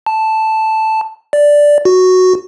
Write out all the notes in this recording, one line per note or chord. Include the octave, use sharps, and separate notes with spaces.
A5
D5
F#4